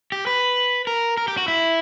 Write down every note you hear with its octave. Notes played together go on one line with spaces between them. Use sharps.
G4
B4
A#4
A#4
G4
F#4
E4